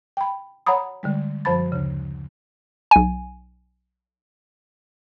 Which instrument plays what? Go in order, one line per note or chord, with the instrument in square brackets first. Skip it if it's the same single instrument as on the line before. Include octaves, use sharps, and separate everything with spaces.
[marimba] G5 B5
C#5 F#5 A#5 B5 D#6
D3 G3 G#3
F#2 F3 C5 A5 B5 A6
D2 C#3
[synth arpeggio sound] B1 G#5